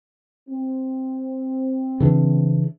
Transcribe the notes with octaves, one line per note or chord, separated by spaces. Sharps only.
C4
C#3 E3 D4